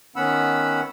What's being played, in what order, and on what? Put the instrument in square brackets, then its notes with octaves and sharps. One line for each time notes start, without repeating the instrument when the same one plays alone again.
[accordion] D#3 B3 C#4 F#5 B5 E6